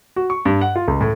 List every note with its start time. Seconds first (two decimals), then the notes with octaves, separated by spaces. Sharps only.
0.16 F#4
0.30 C#6
0.45 G2
0.61 F#5
0.76 F4
0.88 C#2
1.01 A2